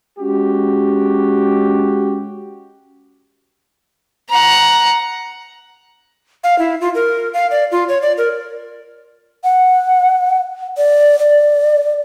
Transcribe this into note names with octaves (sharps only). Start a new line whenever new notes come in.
G#3 C#4 F#4 G4
F#5 A#5
F5
E4
F4
A#4
F5
D5
F4
C#5
D5
A#4
F#5
D5
D5